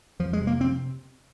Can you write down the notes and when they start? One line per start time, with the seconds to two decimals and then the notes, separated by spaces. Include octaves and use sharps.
0.19 F2 F3
0.33 G#3
0.41 C3
0.47 A#3
0.61 C4